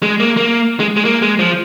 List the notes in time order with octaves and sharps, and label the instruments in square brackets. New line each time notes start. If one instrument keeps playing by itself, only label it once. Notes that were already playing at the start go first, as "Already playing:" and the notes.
[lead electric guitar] G#3
A#3
A#3
G#3
G#3
A#3
G#3
F3